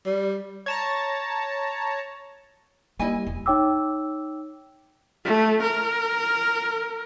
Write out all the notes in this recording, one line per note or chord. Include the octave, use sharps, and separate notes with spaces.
G3
C#5 A5 A#5
G3 A#3 E4 D#5 G#5
E1
D#4 C#5 G5 D6 E6
A3
A#4